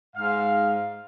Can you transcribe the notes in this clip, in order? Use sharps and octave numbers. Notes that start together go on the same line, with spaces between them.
G#2 F5